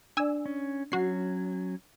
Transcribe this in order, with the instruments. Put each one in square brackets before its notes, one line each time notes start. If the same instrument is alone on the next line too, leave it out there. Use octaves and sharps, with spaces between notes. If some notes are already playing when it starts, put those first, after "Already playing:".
[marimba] D4 D5 [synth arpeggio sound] G#5 E6
[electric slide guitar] C#4
[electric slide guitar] F#3 C#4 [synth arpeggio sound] F#4 C7